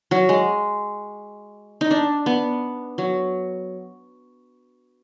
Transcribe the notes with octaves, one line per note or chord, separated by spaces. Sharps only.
F#3
G#3
D#4
D4
B3
F#3